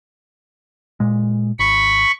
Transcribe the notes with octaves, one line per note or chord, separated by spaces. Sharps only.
A#2 G#3
G#1 B5 C#6